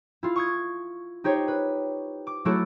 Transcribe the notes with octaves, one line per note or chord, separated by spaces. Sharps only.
E4 F4
C#6 D#6 G#6
D#4 G4 C5 C#5
B4
D6
F#3 A3 E4 F#4 A4 D7